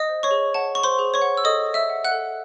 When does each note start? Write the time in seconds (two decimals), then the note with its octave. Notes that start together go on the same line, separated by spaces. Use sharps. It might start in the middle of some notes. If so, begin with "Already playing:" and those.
Already playing: D#5 D#6
0.09 C5
0.23 C#5 C#6
0.31 G#4
0.54 F#5 A5
0.75 G#4 C#6
0.84 C5 C6
0.99 G#4
1.14 C#5 C#6
1.22 F#5
1.37 E6
1.44 A4 D#5 D#6
1.66 D#5
1.74 E5 E6
1.90 F#5
2.04 F#5 F#6
2.12 A4